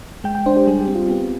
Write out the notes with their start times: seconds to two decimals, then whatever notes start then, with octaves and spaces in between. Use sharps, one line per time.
0.24 G#3 G5
0.35 G5
0.46 D4 C5
0.57 G4
0.67 G3 G#4
0.81 G4
0.88 C4
0.95 F4
1.09 B3 G4